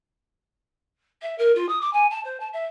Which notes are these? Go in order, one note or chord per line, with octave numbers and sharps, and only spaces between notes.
E5
A#4
F4
D#6
D6
G#5
A5
C5
A5
E5